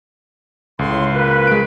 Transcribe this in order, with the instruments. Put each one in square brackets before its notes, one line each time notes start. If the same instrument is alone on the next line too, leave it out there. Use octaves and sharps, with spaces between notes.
[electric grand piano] C#2 [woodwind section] A2 C6
[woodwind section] A#3 F4 B4
[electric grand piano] G#3 D7